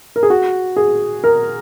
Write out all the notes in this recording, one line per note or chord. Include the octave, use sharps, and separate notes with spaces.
A#4
G#4
F#4
G#4
A#4